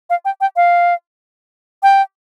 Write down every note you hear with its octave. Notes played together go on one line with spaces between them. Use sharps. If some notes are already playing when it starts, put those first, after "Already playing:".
F5
G5
G5
F5
G5